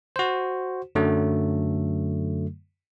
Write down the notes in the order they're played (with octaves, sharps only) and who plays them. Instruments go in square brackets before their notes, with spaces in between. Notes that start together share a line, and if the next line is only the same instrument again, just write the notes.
[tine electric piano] F#4 C5
F#2 D3 F#3 A3